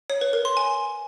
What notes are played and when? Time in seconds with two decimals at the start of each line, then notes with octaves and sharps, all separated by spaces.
0.10 C#5
0.21 B4
0.33 A#4
0.45 C6
0.57 G#5